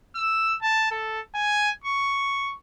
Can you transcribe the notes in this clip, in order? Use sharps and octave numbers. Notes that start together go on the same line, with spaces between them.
E6
A5
A4
G#5
C#6